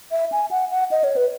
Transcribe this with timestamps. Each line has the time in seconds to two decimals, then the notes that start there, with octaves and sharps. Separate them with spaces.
0.11 E5
0.32 G#5
0.51 F#5
0.70 F#5
0.91 D#5
1.04 C#5
1.16 B4